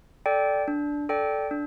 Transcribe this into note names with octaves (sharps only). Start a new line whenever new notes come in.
A4 D5 G5
D4
A4 D5 G5
D4